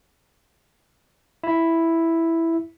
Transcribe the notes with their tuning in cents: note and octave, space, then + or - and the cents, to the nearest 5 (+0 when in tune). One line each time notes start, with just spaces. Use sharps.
E4 +0 E5 +0